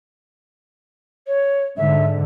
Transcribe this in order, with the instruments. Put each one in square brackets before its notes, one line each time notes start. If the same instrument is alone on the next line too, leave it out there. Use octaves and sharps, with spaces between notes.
[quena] C#5
[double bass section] G#2 D3 [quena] E5